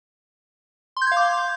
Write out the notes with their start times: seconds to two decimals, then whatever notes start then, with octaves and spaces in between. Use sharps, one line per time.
0.97 C6
1.02 G6
1.07 G#6
1.12 F5
1.17 D6